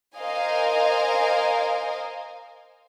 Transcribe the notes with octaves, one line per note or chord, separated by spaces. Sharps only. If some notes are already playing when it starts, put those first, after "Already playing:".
A#4 C5 D#5 F5 G#5